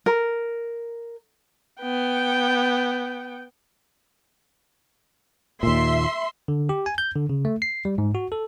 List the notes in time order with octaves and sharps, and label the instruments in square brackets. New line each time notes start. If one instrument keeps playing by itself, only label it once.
[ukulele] A#4
[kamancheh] B3 G5
[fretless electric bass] D#2 A#2 [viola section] E5 C6
[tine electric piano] D3
G4
G#5
G6
D3
C#3
A3
C7
G3
G#2
F#4
A4